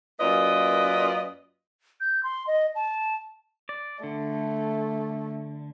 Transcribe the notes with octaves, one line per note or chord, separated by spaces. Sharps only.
F#2 A#3 F4 B4 D5 D#5
G6
C6
D#5
A5
D5
D3 A3